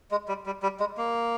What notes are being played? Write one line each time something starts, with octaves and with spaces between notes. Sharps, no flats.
G#3
G3
G3
G3
G#3
A#3